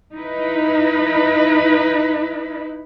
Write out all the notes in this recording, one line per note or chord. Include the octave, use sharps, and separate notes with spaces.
D#4 E4 B4